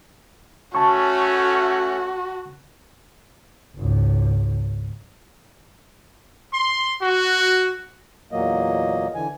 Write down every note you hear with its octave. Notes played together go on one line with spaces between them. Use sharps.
A3 C#4 F#4 A5 C#6
G#1 C#2
C6
F#4
E2 A#2 F#3 A#3 D#5
D3 E3 G#5